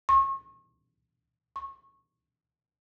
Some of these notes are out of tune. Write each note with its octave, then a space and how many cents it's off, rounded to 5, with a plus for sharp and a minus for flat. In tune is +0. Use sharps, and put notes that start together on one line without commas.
C#6 -35
C#6 -20